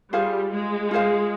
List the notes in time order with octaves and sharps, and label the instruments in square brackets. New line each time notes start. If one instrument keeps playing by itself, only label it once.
[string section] G3 [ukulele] F4 G#4 C5 F5
[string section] G#3
[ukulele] F4 G#4 C5 F5